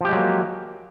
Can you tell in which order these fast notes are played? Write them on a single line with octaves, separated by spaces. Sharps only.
F3 G4 G#3 F#3 A#3